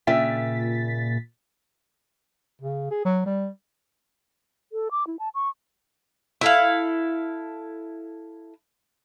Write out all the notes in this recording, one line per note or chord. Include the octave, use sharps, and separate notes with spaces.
A#2 C#3 E5 G5 A6 B6
C#3
G#4
F#3
G3
A4
D6
E4
A5
C#6
E4 A4 F5